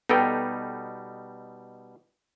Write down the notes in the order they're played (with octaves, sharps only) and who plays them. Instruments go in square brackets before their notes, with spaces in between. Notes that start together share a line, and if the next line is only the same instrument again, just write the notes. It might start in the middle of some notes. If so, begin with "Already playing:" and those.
[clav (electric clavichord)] B2 G3 D#4 [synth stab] B3 A4 G5